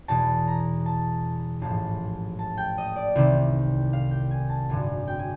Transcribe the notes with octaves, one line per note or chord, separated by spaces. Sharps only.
E2 B2 A5
A#5
A5
A1 G#2 F3 A5
A5
G5
D#5
D5
C2 C3 D#3 E5
F5
G5
G#5
A5
G#1 F#2 D3 G#5
G5
G#5